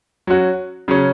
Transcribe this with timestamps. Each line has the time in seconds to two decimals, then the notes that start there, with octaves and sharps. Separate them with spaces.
0.27 F#3 C#4 F#4
0.88 C#3 F#3 C#4